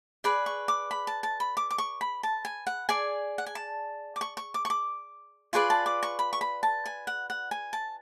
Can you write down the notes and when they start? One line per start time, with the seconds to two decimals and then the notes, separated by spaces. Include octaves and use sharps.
0.24 G#4 B4 D5 B5
0.46 C#6
0.68 D6
0.91 B5
1.07 A5
1.23 A5
1.40 B5
1.57 D6
1.71 D6
1.78 C#6
2.01 B5
2.23 A5
2.45 G#5
2.67 F#5
2.89 G#4 D5 G#5
3.38 F#5
3.46 G#5
3.55 A5
4.16 D6
4.21 C#6
4.37 C#6
4.54 D6
4.65 C#6
4.70 D6
5.53 F4 G#4 B4 D5 C#6
5.70 A5
5.86 D6
6.03 C#6
6.19 B5
6.33 C#6
6.41 B5
6.63 A5
6.86 G#5
7.07 F#5
7.30 F#5
7.51 G#5
7.73 A5